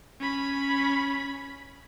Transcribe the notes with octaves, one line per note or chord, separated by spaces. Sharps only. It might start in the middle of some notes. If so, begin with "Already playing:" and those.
C#4 B5